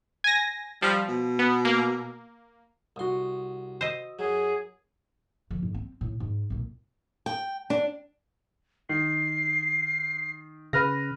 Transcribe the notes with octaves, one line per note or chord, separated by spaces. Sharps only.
G#5 A#6
F3 G3
B2
B3
A#3
C2 F#4 F#5 C6 D#6
C5 D#5 D#6 E6
F#2 F#3 G#4
D3 F3
G#2
C4
A2
G#2
C2 A#2
G5
D4
D#3 C7
C#3 B4 F6 A#6